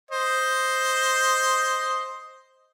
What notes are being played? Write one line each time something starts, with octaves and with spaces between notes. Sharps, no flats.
C5 D#5